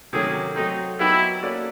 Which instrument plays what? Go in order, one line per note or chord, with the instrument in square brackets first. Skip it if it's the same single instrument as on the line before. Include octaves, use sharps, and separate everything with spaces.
[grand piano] C3 D#3 F#3 A3 C#4 [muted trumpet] G#4
[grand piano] F#3 A3 C4 [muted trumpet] D#4
[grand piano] F#3 B3 D#4 G4 B4 [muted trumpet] E4
[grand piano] A#3 C#4 F#4 A4 D5